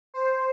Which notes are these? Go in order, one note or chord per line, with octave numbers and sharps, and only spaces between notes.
C5